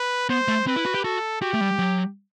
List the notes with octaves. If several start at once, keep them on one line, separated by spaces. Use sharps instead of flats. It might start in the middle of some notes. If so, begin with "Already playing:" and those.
Already playing: B4
B3 C5
A3
C4 B4
E4
F#4
G4
F#4 A4
F#4 G4
A3
G3
F#3